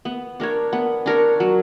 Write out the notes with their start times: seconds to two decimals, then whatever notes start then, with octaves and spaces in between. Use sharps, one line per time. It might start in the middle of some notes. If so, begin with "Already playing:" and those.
0.05 B3
0.40 D4 A#4 C#5
0.73 B3
1.06 D4 A#4 C#5
1.40 F#3